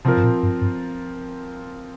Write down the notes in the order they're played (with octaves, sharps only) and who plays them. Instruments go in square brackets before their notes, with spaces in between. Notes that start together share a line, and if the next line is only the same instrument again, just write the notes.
[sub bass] C3 [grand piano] F3 C4 F4 A#4
[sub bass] G2
A#2
G2
G2